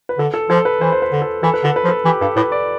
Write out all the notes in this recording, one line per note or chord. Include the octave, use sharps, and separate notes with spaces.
B4
D3 A4
A4
F3 A4
B4
E3 C5
C5
B4
D3
A4
E3 A4
B4
D3 A4
B4
F3
A4
E3 G4
G2 A4
A2 B4
D5